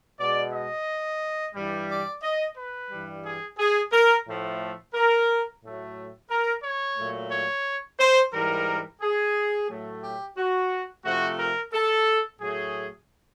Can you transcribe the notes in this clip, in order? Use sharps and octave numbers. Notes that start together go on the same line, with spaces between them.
B2 G#3 D5
D#5
G2 E3 G3
D5
D#5
B4
G2 E3 G3
G#4
G#4
A#4
A2 F3 A3
A#4
A2 F#3 A3
A#4
C#5
A#2 F#3 A3
C#5
C5
G#2 E3 G3 A#4
G#4
A2 F#3 A3
G4
F#4
C3 F3 A3 F#4
A#4
A4
A2 F#3 A3 G#4